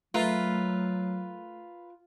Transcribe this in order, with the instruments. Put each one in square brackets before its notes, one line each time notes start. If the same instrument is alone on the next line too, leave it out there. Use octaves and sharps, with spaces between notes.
[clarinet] F#3 [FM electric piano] A3 [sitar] F4 [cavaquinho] A#4 B4 E5